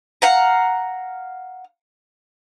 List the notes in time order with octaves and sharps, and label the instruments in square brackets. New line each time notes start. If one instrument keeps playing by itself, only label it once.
[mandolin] F5 F#5 A#5